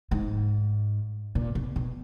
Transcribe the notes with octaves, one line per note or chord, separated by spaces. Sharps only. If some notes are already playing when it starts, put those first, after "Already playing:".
G#2
A#2
B2
B2